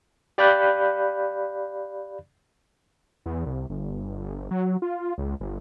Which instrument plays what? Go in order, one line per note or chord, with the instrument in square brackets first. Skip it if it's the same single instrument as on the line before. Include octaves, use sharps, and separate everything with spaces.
[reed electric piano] G4 D5 F5 B5 F#6 G6
[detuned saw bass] E2
C2
G1
F#3
F4
C#2
G1